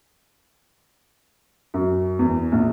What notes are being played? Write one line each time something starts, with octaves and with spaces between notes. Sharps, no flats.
F#2
E2
A#1